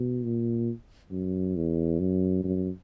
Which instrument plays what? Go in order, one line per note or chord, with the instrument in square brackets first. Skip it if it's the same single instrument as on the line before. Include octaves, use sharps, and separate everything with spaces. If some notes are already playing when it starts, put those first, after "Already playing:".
Already playing: [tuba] B2
A#2
F#2
E2
F#2
F#2